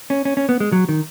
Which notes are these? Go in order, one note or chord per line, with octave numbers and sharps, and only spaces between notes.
C#4
C#4
C#4
B3
G#3
F#3
D#3